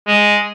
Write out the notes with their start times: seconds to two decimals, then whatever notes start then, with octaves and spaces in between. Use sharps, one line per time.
0.07 G#3